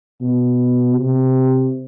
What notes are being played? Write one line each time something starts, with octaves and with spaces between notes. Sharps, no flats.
B2
C3